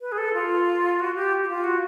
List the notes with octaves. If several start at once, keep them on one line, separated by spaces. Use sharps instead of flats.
B4
G#4
A4
F4
F#4
G4
F#4
F4
F#4